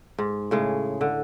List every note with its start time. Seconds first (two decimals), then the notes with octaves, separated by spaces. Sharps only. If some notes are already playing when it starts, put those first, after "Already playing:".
0.18 G#2
0.51 A2 C#3 G#3
1.01 D3